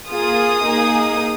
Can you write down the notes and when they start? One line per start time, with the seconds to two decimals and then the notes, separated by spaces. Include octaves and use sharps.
0.11 A#3 F4 G#4 D#6
0.66 A#3 D#4 G#4